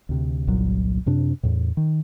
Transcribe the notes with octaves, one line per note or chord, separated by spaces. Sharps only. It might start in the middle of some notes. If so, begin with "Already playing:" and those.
D2 C3
G1 C2 A#2 F#3
F#2 C3 D4
E2 A2
D#3